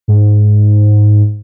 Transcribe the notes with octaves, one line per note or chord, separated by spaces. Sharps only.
G#2